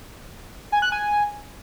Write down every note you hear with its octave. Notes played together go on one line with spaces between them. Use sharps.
G#5
F#6
G#5